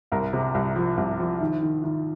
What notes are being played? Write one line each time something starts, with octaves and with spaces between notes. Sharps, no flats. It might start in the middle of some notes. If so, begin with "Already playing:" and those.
C2 A#4
C3
C2
F3
C2
F3
D#3
D#3
D#3